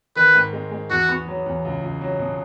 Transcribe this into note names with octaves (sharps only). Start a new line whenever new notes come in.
D#3 B4
G#2
G#3
G#3
E2 F#4
B3
F#3
E2
C#2
C#2
F#3
B2